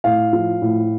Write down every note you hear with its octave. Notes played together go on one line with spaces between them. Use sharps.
A2 F5
F3
A2